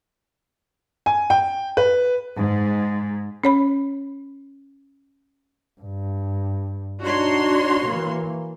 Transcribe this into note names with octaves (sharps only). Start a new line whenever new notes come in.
G#5
G5
B4
G#2
C#4 C#5 B5
G2
D4 D#4 F#4 C#5 C6
E3 A#3